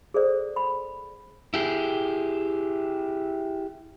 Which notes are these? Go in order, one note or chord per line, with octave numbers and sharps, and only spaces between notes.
G#4 A4 C5 D5
B5
E4 G4 G#4